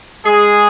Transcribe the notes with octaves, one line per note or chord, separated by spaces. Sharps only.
G#3 G#4